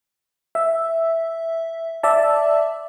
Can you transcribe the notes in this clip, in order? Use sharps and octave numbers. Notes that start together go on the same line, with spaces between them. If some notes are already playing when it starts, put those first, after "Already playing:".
E5
D5 E5 A5